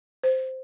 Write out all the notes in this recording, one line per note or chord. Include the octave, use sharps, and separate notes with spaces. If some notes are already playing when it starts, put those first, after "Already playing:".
C5